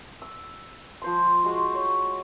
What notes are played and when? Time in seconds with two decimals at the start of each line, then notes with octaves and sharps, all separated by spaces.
0.22 E6
1.02 F3 C5 C6
1.44 G#3 F#4
1.74 C#5